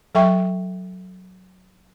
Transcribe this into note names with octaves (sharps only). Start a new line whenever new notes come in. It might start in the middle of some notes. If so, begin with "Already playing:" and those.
F#3 A4 E5 G5 C#6